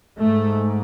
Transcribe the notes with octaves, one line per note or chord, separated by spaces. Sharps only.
G#2 A3